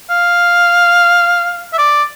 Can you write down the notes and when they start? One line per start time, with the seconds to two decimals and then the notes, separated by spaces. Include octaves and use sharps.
0.10 F5
1.73 E5
1.78 D5